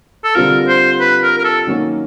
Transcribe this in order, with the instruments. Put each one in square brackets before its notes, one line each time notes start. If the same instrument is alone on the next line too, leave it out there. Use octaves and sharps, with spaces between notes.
[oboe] A4
[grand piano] D3 G3 C4 F4 [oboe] A#4
[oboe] C5
B4
A#4
A#4
A4
[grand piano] D#3 F#3 A#3 C#4 F#4